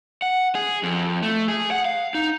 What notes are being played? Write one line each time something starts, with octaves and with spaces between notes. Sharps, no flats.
F#5
G#4
F2
A3
G#4
F#5
F5
D#4